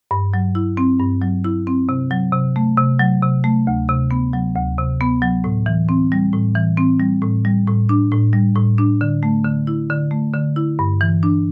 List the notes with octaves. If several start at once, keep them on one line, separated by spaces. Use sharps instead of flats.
G2
F#3
E4
C4
G2
F#3
E4
C4
C3
F#3
C3
A3
C3
F#3
C3
A3
D2
C3
B3
F#3
D2
C3
B3
F#3
A2
E3
C4
G3
A2
E3
C4
G3
A2
G3
A2
D4
A2
G3
A2
D4
D3
A3
D3
E4
D3
A3
D3
E4
G2
E3
D4